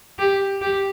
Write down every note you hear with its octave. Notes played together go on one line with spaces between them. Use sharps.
G4
G4